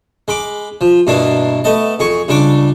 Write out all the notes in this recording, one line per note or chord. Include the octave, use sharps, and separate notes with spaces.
G#3 B5 D6
F3
G2 B2 A#3 D4 E4
A3 B3 D#5 A5
F2 G#4 C#6
C#2 G3 D4 C#6 D6